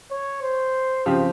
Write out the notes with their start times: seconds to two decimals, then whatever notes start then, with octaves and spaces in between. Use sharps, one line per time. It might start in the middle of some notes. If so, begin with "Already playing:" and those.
0.11 C#5
0.42 C5
1.06 C#3 F3 C4 G4